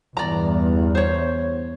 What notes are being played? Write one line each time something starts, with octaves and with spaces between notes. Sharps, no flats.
E2 G2 D5 A#5
C5 C#5